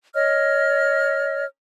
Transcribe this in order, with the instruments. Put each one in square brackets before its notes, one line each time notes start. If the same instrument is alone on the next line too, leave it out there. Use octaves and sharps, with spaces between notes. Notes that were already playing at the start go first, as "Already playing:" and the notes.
[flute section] C#5 D#5 F6